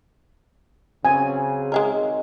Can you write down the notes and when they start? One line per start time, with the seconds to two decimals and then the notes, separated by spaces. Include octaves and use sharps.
1.05 C#3 F#3 C4 G#5
1.72 D#3 G#3 G#4 A#4